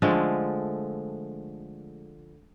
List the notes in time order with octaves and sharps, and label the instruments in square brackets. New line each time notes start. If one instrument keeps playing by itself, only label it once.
[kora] D3 F3 G#3 A3